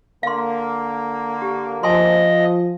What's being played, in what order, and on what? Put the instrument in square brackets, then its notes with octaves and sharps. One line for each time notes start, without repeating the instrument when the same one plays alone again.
[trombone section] D3 A#3 [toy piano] F5 C6
[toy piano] G4
[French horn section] F3 [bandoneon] D#5 [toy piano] G#5 A5 C6